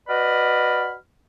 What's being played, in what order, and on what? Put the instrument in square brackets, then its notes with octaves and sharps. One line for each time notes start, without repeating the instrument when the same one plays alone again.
[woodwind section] F#4 B4 D5 D#5 B5 F6